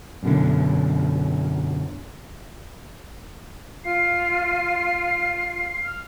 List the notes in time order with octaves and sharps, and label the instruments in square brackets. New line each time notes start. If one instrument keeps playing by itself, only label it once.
[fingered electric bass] F#2 B2 D3
[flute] F4 [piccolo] C7
[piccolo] F6